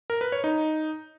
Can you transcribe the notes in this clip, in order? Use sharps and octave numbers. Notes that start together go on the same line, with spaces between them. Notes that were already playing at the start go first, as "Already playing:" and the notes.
A#4
B4
C#5
D#4